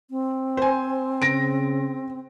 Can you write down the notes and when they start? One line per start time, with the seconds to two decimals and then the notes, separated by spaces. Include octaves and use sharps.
0.11 C4
0.57 C5 G#5
1.22 C#3 A#6 D7